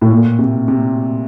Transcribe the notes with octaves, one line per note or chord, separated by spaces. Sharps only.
A2
A#2
C3
C3